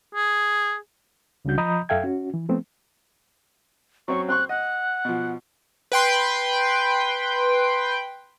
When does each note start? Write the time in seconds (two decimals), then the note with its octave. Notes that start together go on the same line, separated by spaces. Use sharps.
0.15 G#4
1.45 C#2 C#3 G3 D4 F#4 G6
1.58 F3 D#5 A#5 B5 D#6 G6
1.89 F#2 A4 E5 F5 G5 G#6
2.03 C#4 F#4
2.34 E3
2.49 F3 A3 B3 C4
4.08 F#3 C4 C#4 C#6
4.29 C4 C6 C#6 F#6
4.49 D#5 F#5
5.05 B2 F3
5.92 B4 G5 C6